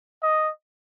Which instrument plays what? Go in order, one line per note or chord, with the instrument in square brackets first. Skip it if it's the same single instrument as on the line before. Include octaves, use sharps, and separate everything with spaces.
[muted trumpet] D#5